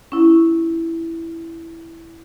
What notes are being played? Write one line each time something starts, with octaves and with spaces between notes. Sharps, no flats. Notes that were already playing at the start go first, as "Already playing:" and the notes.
C#4 E4